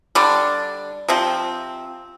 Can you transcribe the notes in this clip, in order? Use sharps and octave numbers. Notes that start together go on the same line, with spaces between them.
D3 G3 D4
C3 F3 C4